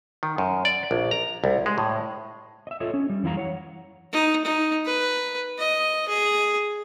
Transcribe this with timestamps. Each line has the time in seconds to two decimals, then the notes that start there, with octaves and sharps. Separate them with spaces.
0.23 D#3
0.38 F#2
0.65 D5
0.91 A#1
1.11 A#5
1.44 C2
1.66 G#3
1.78 A2
2.67 D#5 E5
2.80 F4 A4 C#5 D#5 E5
2.94 C#4
3.10 G3
3.23 F#2 E3 E4 F5 A#5
3.37 C#5 F#5
4.13 D#4
4.45 D#4
4.86 B4
5.58 D#5
6.09 G#4